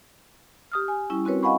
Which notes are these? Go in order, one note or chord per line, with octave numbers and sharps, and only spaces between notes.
G4 D#6 F6
G#5
G3 C#4 E4
C4 F#4 A#4 B4 C#5
D#5 F5 F#5 G#5 B5 C#6